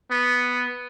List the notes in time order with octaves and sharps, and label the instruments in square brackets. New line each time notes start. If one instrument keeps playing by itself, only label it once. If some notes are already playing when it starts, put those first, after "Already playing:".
[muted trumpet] B3